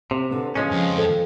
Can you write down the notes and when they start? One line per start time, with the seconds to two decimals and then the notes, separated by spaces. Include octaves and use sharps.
0.11 C3 C4
0.31 E2 D3 B3
0.56 C#3 F3 G#3 B3 C#4
0.71 F2
0.97 F4 A4 C5